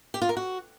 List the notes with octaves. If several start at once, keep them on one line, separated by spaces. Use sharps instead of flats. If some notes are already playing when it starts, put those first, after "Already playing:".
G4
F4
A#4
F#4